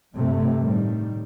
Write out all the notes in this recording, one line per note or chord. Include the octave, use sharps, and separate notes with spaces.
G2 C3 A3
A2 D#3 G3